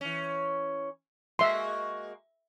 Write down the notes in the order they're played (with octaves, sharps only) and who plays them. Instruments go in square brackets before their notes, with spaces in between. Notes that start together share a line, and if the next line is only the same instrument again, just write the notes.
[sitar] E3 C#4
[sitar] G#3 A#3 F#4 [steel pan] E5 C6